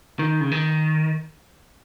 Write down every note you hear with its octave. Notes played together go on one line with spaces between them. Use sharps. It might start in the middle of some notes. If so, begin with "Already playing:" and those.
D#3
C#3
D#3